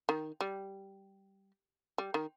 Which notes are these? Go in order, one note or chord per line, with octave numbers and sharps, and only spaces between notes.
D#3
G3
G3
D#3